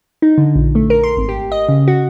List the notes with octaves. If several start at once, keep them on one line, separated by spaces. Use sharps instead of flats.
D#4
D3
A#1
A3
A#4
C6
G#1
G4
D#5
C#3
F#4